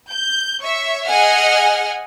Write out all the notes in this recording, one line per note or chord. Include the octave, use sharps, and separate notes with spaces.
G6
C#5 E5 C#6
G#4 D#5 F#5 G#5 F6